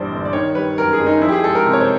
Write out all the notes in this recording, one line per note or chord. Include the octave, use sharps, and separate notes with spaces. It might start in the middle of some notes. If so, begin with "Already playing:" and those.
Already playing: A#1 G2 E3 G3 C5 D5
G1
D5
D#3 C#5
G3 B4
F#2 A#4
G#4
F#1
D#4
F3 E4
G4
G#4
G#3 A4
A#4
C3
C#5
C5